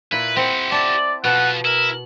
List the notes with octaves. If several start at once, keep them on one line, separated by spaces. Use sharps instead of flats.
A#2 E4 B4
C4 G4 F#5
D5 E5 A5
B2 F4 A4 F#5
E4 A#4